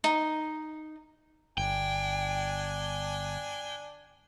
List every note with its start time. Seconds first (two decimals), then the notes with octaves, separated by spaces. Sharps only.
0.04 D#4
1.58 G1 D4 G5 G#5